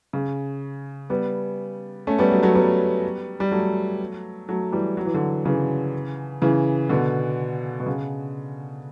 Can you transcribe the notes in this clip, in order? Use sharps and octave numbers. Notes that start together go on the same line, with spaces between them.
C#3
G3 B3
A3 C#4
G3 B3
F#3 A3
F#3 A3
G3 B3
G3
F#3 A3
F#3 A3
E3 G3
F#3
E3
D3 F#3
C#3 E3
C#3 E3
B2 D3
B2
C#3